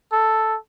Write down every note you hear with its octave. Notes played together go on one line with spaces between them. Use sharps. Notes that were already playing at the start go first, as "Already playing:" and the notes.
A4